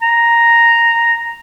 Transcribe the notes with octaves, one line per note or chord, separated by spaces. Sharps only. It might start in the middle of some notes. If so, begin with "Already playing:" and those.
A#5